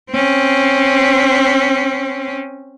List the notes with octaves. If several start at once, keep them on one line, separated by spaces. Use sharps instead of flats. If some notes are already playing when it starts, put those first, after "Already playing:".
C4 C#4